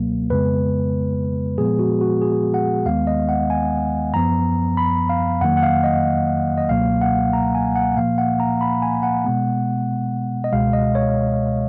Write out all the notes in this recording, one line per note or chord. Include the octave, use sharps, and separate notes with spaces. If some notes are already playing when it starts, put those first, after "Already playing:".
Already playing: C#2 B2 F#3 A#3
F2 C#3 G#3 B3 B4
A#2 F3 G#3 B3 G#4
F#4
F#4
G#4
F#5
D#2 D#3 G#3 B3 F5
D#5
F#5
G#5
F#2 F3 B3 A#5
B5
F5
F2 D#3 F#3 A#3 F#5
F#5
F5
D#5
D#5
C#2 B2 F#3 A#3 F5
F#5
A#5
G#5
F#5
A#2 F3 A#3 F5
F#5
A#5
B5
G#5
F#5
B2 G#3 B3
D#5
C#2 B2 G#3 F5
D#5
C#5